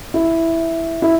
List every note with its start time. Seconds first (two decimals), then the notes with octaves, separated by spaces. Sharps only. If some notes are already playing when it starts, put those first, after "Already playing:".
0.14 E4
1.02 E4